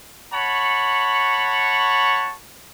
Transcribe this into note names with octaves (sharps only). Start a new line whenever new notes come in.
C#5 F#5 A5 B5 C#6